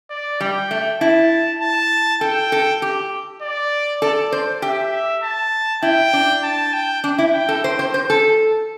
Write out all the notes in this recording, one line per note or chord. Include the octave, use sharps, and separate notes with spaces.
D5
G3 G5
A3
E4 A5
A5
A4 G5
A4
G4
D5
A4 D5
C5
G4 E5
A5
E4 G5
D4
A5
G5
D4
E4
G5
A4
C5 G5
C5
C5
A4